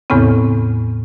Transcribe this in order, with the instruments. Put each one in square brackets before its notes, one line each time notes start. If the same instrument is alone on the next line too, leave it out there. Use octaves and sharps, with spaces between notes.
[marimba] E2 A2 C#3 B3 C4